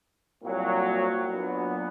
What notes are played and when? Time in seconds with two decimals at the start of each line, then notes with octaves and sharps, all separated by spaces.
0.42 C2 A#2 F#3
1.28 A#2 F#3 B3 D4